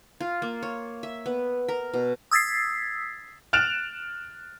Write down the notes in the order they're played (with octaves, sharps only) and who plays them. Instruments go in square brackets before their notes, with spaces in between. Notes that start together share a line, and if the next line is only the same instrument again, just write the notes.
[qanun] F4
A#3
C#5
E5
B3
A#4
B2
[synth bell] D#6 E6 G#6 A6 B6 C7
[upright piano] F6 F#6 A6 D7 E7 F7